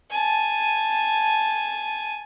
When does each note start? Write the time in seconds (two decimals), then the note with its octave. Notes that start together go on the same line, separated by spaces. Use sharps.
0.10 G#5 A5